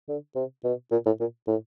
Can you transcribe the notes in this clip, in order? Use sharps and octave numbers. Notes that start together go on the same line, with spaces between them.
D3
C3
B2
A#2
A2
A#2
A2